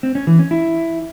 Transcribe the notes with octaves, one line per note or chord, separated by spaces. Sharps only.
C4
C#4
E3
C#4
E4